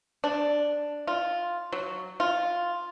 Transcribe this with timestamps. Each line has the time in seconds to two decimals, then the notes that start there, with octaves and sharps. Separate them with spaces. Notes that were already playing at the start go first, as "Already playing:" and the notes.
0.24 D4
1.07 F4
1.72 F#3
2.20 F4